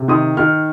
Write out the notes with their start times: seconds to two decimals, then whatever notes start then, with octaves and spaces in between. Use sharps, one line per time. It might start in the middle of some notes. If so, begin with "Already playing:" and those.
Already playing: C3
0.08 D#3 D#6
0.37 D#3 F6